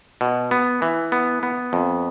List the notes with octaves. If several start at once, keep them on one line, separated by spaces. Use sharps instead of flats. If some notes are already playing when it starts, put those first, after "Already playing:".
B2
B3
E3
B3
B3
F2